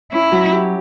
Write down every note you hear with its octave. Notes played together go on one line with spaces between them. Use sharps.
C#4 E4
F#3
G4